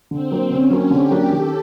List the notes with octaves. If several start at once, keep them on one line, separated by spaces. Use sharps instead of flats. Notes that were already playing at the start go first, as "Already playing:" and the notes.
D3 C4
F#3 A#3 D4
D3 C#4
F#3 A#3 D4
D3 G4
F#3 A#3 D4
D#3 A4